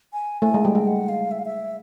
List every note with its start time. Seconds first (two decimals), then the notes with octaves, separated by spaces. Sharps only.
0.13 G#5
0.42 A3 G#5
0.54 G#3
0.65 G3 G5
0.75 G#3
0.87 F#5
1.09 F5
1.31 E5
1.39 F5
1.45 E5